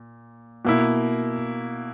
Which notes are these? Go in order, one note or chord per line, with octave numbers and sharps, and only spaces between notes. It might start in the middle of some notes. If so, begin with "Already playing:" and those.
Already playing: A#2
B2 A#3 E4